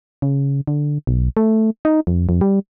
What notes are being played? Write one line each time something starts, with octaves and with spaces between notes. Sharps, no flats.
C#3
D3
B1
A3
D#4
F2
F2
G3